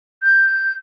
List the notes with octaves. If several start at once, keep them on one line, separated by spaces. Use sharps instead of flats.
G6